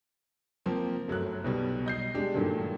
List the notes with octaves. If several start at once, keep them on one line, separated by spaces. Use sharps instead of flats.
F3 A#3 C4
G1 F#3 A3 F#6
B1 B2 G3
D#5 G6 C7
G#3 D4 G4
G2 A#2 D3 D#3 F#3 A3